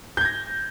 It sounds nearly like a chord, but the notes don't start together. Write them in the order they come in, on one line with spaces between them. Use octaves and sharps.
G6 G#6 A#6